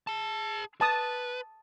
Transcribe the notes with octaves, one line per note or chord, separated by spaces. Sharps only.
G#4 A5
B4 A5 D#6